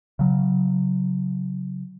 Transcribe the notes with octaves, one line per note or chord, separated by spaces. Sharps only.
C#3 F#3